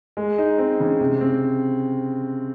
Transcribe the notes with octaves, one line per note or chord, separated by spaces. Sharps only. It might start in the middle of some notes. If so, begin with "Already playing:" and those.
G#3
D#4
C4
C#3
C3
C4